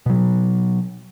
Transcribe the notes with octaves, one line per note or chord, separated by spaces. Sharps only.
B2 F#3